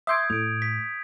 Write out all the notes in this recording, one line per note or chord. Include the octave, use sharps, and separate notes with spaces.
E5 C6 D6 D#6 G6 G#6
A2 D7 F7
B6